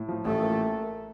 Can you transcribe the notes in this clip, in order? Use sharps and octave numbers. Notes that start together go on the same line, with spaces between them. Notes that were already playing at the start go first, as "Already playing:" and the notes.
Already playing: A2
F3
A1 A3
A#3